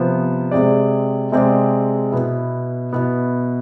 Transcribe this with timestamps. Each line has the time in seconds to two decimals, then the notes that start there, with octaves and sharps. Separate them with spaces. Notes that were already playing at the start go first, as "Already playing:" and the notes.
Already playing: C3 F3 B3
0.51 C3 G#3 C4 G#4 D5
1.32 C3 G#3 C4 G#4 D5
2.12 B2 B3 E4
2.92 B2 B3 E4